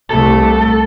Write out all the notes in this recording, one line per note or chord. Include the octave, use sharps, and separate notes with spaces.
C2 A3 A4